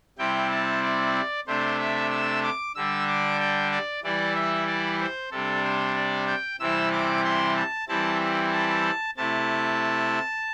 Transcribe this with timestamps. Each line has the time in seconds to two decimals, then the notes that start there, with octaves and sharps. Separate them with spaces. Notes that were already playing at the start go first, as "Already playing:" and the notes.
0.18 C3 G3 C4 E4 G5
0.51 A5
0.83 D5
1.47 C3 A3 D4 C5
1.79 E5
2.11 E6
2.43 D6
2.75 D3 G3 D4 E6
3.08 D6
3.39 G5
3.72 D5
4.03 E3 G3 E4 D5
4.35 E5
4.67 D5
5.00 C5
5.31 C3 G3 D4 A4
5.64 C5
5.96 D5
6.27 G5
6.60 C3 E3 G3 C4 E4 E6
6.92 D6
7.25 C6
7.56 A5
7.88 E3 G3 C4 E4 A5
8.52 A5
9.17 C3 A3 E4 A5